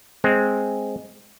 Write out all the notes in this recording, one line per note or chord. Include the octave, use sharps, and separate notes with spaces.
G#3 C4